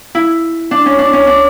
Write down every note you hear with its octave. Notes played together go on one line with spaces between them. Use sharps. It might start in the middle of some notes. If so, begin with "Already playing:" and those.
E4
D4
C#4
D4
C#4
D4